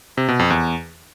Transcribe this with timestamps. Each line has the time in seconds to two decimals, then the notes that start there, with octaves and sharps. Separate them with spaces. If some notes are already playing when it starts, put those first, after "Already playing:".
0.18 C3
0.28 B2
0.39 F2
0.50 E2